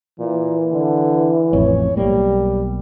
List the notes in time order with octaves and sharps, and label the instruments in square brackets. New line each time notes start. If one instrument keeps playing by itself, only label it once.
[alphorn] A#2 [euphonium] E3
[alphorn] D3
[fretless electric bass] A1 F2 [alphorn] C#5
[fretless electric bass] B1 A#3 [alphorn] G3